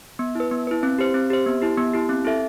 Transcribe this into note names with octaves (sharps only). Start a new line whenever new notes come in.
B3
E4 B4
B3
E4 B4
C4
G4 C5
C4
G4 C5
B3
E4 G4
B3
E4 G4
C4
E4 A4 E5